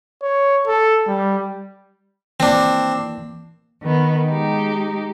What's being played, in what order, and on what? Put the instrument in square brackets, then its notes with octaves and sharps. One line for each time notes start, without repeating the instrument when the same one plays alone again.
[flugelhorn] C#5
A4
G3
[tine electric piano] E3 A#3 [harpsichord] C4 D4
[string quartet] D#3 B3
G#3 D#4 G4